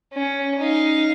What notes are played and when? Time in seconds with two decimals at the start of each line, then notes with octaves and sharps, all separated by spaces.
0.13 C#4
0.60 D#4 F5